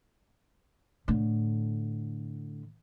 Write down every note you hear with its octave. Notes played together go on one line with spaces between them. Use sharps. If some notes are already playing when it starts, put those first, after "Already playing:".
A2 D3